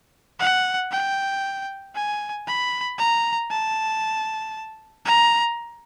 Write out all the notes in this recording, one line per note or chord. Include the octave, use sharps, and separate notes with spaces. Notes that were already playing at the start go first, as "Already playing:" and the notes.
F#5
G5
G#5
B5
A#5
A5
A#5